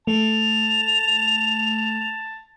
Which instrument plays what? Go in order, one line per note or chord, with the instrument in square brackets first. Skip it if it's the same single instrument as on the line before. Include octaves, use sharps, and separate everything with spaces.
[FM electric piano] A3 [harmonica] A5 [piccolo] F7